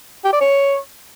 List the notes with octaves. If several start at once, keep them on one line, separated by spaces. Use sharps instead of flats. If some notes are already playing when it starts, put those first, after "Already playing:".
G4
D5
C#5